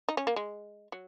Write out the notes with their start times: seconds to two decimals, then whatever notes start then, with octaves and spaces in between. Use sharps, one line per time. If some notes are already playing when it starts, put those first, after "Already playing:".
0.09 D#4
0.17 C#4
0.27 A#3
0.36 G#3
0.92 F#3